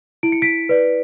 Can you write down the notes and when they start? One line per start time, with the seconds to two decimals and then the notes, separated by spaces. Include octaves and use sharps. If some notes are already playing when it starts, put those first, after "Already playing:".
0.23 E4 D7
0.32 C#7
0.42 B6 D7
0.69 B4 D5